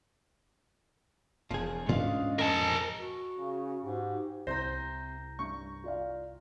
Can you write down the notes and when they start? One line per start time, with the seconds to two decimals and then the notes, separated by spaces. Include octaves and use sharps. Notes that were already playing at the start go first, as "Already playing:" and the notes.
1.51 E1 E2 F3 G#4
1.89 G#2 C#4 D4 F4 D#5 F5
2.39 F2 A#4 G#5 A5
2.99 F#4
3.38 C#3
3.84 G#2 G4
4.47 C2 C3 C5 A#5 G6 A#6
5.39 G2 C#6
5.84 F4 D5 F5